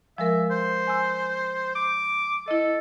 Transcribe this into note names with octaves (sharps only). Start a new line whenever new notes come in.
F3 G#3 A#4 E5
C5
G#5 E6
D6
E4 A4 D#5